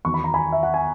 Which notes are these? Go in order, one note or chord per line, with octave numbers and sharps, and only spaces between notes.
E2 D#3 F#3 C#6
B5
A#5
G#5 B5
E5
F#5
G#5